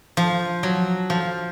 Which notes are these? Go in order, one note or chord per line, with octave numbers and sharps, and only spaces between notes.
F3
F#3
F3